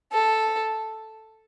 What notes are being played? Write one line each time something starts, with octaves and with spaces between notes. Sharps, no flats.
A4